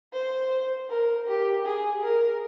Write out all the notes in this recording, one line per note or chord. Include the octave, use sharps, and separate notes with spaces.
C5
A#4
G4
G#4
A#4